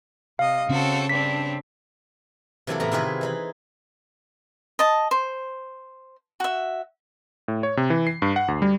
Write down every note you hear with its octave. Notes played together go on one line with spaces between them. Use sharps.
C3 D#5 F5
C#3 C4 C#4 F#4 A4
G2 C4 D4 B6
C3 E3 F#3 A#3 E4 A4
A2 E3 B3 E4 A#4 A#5
C3 D#3 E4 F4 G#4 B4
E3 D#4 B5
D#5 A5
C5
F#4 E5
A2
C#5
C3
E3
C7
G2
F#5
D2
G3